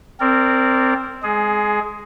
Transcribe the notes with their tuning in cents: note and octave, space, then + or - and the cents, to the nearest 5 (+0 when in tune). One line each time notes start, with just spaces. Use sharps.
C4 +0 A#4 -25 D5 -15
G#3 +0 G#4 +20